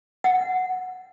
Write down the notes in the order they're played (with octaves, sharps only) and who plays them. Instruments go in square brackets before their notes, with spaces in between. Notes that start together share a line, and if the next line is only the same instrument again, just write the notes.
[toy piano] F#5